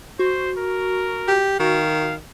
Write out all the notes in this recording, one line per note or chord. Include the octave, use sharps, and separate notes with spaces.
F#4 C5
A#4
G4
D#3 F#4 F5